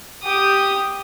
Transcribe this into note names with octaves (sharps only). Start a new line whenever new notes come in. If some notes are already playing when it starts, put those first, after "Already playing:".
G4 D#6